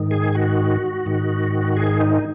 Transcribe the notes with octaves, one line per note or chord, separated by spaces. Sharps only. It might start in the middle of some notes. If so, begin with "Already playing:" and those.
Already playing: G#2 D#3
G#4
F#4
G#2 D#3
G#4
D#4